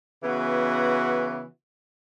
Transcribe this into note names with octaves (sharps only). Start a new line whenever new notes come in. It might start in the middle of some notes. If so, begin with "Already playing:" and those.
C#3 E3 B3 F#4